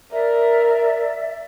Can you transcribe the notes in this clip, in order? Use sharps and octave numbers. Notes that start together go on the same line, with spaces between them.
A#4 D5 E5